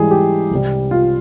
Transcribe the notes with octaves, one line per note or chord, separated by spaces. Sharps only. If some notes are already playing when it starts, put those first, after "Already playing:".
Already playing: G#2 E3 G3 G#4
G4
C2 C3 G3
F4